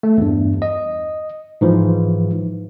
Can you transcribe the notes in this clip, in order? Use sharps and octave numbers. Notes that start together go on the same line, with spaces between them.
A3
E2 G2
D#5
G#2 E3 F3